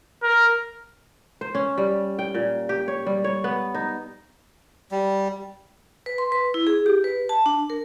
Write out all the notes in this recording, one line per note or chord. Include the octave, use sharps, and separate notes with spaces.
A#4
C5
C#4
G3
G5
A#2
G4
C#5
G3
C#5
B3
D#4
G3
B4
C6
B4
E4
G#4
G4
B4
A5
D4
A#4